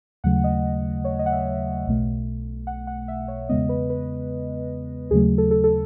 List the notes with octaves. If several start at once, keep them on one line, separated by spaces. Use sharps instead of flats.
D#2 C#3 F#3 A3 F#5
D#5
C#5
D#5
F#5
E5
B1 B2 A3
F#5
F#5
E5
C#5
E2 C#3 G#3 B3 D#5
B4
B4
D#2 C#3 F#3 A3 G#4
A4
A4
A4